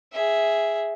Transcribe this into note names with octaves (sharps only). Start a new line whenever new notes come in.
G#4 E5